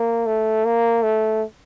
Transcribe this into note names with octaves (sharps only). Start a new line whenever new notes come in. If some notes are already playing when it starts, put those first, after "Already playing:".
Already playing: A#3
A3
A#3
A3